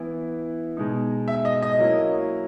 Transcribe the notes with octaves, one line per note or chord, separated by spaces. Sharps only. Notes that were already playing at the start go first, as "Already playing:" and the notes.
Already playing: E3 B3 E4
B2 G#3 D#4
E5
D#5
D#5
F#3 A#3 C#4 E4